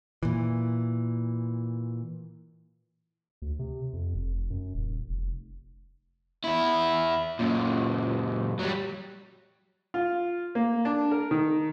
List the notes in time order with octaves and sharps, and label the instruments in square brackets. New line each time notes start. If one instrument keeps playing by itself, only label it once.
[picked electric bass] A#2 E3
[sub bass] D2
C3
F2
F1
F#2
D#1
F1
[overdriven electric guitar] E2 E4
F#2 A#2
F#3 G3
[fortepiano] F4
A#3
D4
A#4
D#3